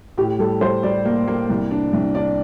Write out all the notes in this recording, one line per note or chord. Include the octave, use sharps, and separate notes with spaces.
A2 G4
G3 A4
G3 C5
G3 D5
A#3
A#3
C2
D4
C2
D4 D5